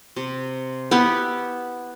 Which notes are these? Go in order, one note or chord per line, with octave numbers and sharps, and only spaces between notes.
C3
B3 E4 G4 F#5